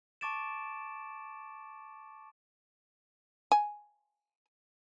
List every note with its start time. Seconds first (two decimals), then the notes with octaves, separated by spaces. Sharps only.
0.21 A5 C#6 D6 A6 D7 E7
3.52 G#5